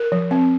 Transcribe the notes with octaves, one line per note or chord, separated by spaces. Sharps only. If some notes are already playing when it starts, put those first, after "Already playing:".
Already playing: A#4
F3
C4